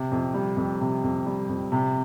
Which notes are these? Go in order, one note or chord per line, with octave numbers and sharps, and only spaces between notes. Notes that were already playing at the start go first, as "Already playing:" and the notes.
Already playing: C3
F2
G3
F2
C3
F2
G3
F2
C3